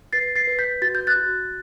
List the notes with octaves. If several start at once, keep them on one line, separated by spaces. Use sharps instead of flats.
B4 A6 C7
A6 C7
B4
G6 B6
F#4 A6
G6
F#6 A6
F#4